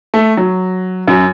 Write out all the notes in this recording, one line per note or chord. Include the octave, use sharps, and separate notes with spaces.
A3
F#3
F#2